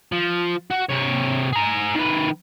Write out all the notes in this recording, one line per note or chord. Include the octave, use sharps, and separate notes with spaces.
F3
F#4
C3 C#5
G#4 A#5
D#3 B4